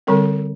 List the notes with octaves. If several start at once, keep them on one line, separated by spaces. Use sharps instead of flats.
D3 G3 C4 A#4